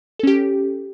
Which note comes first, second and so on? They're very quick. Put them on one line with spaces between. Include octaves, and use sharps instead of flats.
A4 C#4 G4